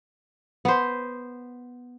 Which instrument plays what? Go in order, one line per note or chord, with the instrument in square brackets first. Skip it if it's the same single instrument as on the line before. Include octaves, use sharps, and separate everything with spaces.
[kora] B3 C5